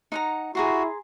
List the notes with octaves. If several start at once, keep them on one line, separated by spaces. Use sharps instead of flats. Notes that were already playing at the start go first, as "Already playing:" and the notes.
D#4 F#5 A#5
E4 F#4 G#4 A#5 C6